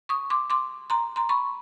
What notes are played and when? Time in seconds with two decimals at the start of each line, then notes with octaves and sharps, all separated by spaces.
0.09 C#6 D#6
0.30 C6 D6
0.50 C6 D6
0.90 A#5 C6
1.16 A#5 C6
1.29 B5 C#6